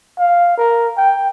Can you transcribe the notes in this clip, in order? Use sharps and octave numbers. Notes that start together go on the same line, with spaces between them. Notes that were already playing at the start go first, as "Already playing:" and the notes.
F5
A#4
G5